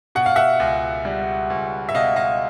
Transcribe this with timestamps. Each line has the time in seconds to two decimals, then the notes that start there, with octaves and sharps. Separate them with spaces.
0.15 B2 F#5
0.26 F5
0.36 E5 F#5
0.60 C#2
1.05 G3
1.50 C#2
1.89 E5
1.95 B2 D#5 F5
2.16 D#5 F5